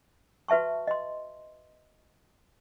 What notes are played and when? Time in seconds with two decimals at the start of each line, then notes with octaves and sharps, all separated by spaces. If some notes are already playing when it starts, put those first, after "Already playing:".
0.48 F#4 B4 E5 A5 C#6
0.87 D#5 C6